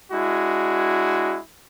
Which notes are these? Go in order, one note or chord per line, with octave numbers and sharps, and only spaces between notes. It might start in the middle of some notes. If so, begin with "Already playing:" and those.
G#3 D4 E4 F#4